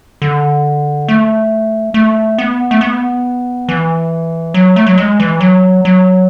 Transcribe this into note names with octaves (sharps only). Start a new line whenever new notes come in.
D3
A3
A3
B3
A3
B3
E3
F#3
A3
F#3
G#3
E3
F#3
F#3